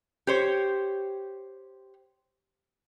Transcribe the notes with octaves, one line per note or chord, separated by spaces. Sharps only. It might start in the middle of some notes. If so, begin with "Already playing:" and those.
G4 C5 C#5